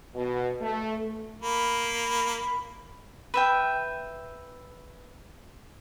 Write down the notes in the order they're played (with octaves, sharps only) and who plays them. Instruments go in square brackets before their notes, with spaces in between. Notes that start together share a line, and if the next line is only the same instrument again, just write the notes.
[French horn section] B2
A3
[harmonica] A#3 [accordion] B5
[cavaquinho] B4 E5 G5